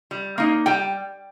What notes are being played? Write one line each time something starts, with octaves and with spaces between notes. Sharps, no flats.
G3
A#3 D#4
G3 G5